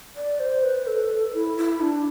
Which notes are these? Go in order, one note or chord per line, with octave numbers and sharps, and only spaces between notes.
D5
C5
B4
A4
E4
E4
D4